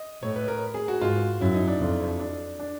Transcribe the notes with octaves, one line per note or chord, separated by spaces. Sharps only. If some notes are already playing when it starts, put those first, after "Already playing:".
Already playing: D#5
A2 C#5
B4
A#4
G#4
F#4
G#2 F4
F#2 E4
D#4
D4
F2
D4
D4